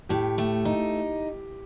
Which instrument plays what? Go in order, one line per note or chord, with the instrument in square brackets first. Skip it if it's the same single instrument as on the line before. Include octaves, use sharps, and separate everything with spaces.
[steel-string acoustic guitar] A2 [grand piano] G4
[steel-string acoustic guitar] A3
D#4